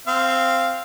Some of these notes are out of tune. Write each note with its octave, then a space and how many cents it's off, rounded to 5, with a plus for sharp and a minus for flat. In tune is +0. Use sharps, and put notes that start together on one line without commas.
C4 +0 F5 -10